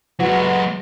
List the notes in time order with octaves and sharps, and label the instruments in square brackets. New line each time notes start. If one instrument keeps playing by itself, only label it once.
[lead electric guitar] F#3 G#3 [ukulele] F#4 F#5 [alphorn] B4